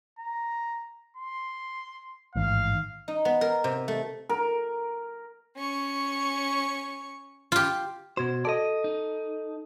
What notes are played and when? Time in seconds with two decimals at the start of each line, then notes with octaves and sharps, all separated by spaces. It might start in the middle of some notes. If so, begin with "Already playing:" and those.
0.19 A#5
1.17 C6
2.36 A1 G#2 D#3 F5
3.08 D#4
3.25 B3
3.41 A#4
3.64 C3
3.88 A3
4.29 A#4
5.57 C#4 C#6
7.52 F4 G4
8.17 B2 F#4 C5 G#6
8.45 A4 D5 D#5 A5
8.84 D#4